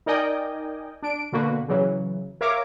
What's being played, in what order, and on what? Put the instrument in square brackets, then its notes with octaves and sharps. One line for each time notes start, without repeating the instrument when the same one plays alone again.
[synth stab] D#4 A#4 D5 D#5 G5 G#5
D4 D7
B2 D3 A#3 F#4 B4
C#3 E3 F#3
A#4 C#5 E5 F5 A#5 D6